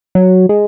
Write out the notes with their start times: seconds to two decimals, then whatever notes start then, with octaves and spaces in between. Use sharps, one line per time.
0.15 F#3
0.49 G#3